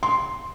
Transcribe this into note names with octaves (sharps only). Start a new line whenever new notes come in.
C6